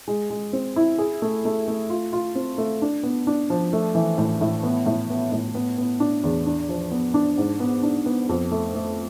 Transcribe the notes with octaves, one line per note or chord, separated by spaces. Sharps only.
G#3
G#3
C4
E4
G#4
A3
A3
A3
F4
F4
C4
A3
D4
B3
D4
F3
A3
E3
A2
A2
B3
A2
B3
A2
B3
B3
D4
E2
D4
F3
B3
D4
G#2
B3
D4
B3
F2
A3
A3